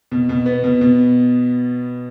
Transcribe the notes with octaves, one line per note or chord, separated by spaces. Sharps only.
B2
B2
B3
B2
B2